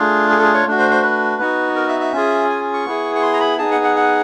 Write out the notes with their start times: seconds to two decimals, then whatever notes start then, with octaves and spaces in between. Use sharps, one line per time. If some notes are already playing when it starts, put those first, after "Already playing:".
Already playing: A3 D4 F4 G#4
0.30 G#4
0.37 A4
0.42 G#4
0.54 C#5
0.66 A3 D4 F#4
0.78 C5
0.91 C5
1.02 B4
1.39 B3 D#4 F#4
1.76 A#4
1.88 E5
2.00 E5
2.12 C#4 F4 G#4
2.50 G#5
2.73 C#6
2.86 B3 E4 G#4
3.15 C#6
3.22 C6
3.34 A#5
3.40 B5
3.59 B3 D#4 G#4 A5
3.71 F#5
3.84 F#5
3.96 F#5